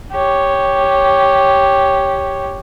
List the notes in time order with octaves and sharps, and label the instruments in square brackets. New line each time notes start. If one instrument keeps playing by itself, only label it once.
[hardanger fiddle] G4 C#5